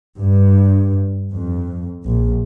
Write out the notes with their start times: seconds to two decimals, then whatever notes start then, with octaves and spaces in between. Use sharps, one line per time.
0.19 G2
1.31 F2
2.05 A#1